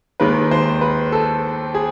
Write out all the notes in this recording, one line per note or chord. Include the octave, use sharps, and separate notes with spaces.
D#2 D#3 G#3 B4
C5
B4
A4
G#4